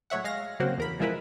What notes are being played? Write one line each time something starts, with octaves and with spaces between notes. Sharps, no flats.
A2 F#3 C#5 E5 F#5
G#3 F5 A#6
C#3 F#3 A#3 C4 F#4 C5
E2 A#4 B5
B2 F3 G#3 E4 A#4 B4